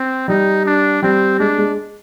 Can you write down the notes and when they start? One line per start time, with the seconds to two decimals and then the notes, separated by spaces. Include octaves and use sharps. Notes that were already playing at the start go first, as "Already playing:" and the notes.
Already playing: C4
0.28 G3 D#4
0.66 D4
1.02 G3 C4
1.39 G#3 D4
1.58 G#3